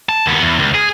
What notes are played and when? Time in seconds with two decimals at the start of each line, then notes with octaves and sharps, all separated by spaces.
0.09 A5
0.26 D#2 B3
0.42 E2
0.59 C#2
0.75 G#4